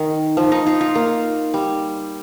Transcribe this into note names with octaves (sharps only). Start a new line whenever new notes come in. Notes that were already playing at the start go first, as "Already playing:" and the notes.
Already playing: D#3
F3
D#4
F4
F4
A#3
G3